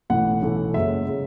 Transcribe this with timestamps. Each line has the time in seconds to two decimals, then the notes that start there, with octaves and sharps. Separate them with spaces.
0.10 B1 A2 E3 A3 F#5
0.42 B1 A2 E3 A3
0.74 F#1 F#2 C#3 G#3 E5
1.06 C#3 G#3